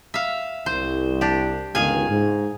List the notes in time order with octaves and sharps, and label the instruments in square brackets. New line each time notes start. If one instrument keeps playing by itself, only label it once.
[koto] E5 F5
[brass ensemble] C2 [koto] C5
[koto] D4 G4
[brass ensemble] G1 C#2 D#3 [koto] G#4 F5 G#5
[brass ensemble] G#2